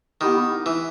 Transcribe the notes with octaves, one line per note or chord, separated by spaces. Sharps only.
D#3 B3 E4 G4
E3